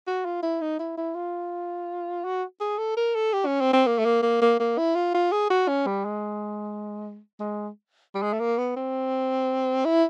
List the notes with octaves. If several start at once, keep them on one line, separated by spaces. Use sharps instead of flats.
F#4
F4
E4
D#4
E4
E4
F4
F#4
G#4
A4
A#4
A4
G4
C#4
C4
C4
A#3
A3
A#3
A#3
A#3
A#3
E4
F4
F4
G#4
F#4
C#4
G3
G#3
G#3
G3
G#3
A3
A#3
B3
C4
E4